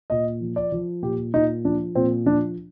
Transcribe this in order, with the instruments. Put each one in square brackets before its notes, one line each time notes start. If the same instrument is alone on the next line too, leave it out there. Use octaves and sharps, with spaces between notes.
[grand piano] A#2 D#5
F3
D5
F3
A#2 G4
A#2 D#4
F3 D4
A#2 C4
F3 D4